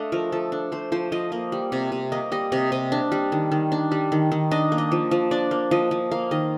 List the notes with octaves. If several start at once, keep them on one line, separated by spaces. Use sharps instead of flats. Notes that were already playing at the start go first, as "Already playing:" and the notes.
Already playing: A3 D4 D#5 F5
F3 A#4
F3 A4
D4
A3 C5
F3 C5
F3 D#5
A#3 D#5
G3
C3
C3
A#3 D#5
G3 D#5
C3 D#5
C3 D#5
D4
G3
D#3
D#3
D4
G3
D#3
D#3
D4 D#5
A#3
D#5
F3
F3
D4 D5
A#3
F3 D#5
F3
A#3 F5
D#3 D#5